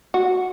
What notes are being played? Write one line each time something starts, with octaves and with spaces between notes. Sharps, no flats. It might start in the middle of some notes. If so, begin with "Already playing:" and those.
F#4